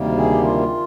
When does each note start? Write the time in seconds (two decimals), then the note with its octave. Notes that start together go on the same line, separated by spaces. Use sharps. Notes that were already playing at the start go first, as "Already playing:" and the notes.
Already playing: D2 C3 D#3 G3 A#3
0.18 G#4
0.31 G4
0.44 F4